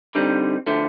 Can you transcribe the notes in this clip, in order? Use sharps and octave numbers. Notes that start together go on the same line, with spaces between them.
D3 G3 C4 D#4
D3 F3 A3